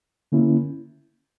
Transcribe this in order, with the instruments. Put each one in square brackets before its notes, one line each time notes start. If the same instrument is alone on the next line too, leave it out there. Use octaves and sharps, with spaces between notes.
[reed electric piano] D3 A#3 C#4 E4